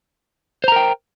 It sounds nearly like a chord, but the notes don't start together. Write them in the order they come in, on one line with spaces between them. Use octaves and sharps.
C5 A#5 A#4 G5